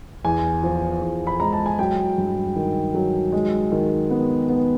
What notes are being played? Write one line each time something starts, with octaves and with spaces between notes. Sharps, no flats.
E2 G#5
F3
E2
B5
G#3 A#5
A5
G#5
F#3 G5
G2
D#3
F#3
G#3
D#3
B3
B3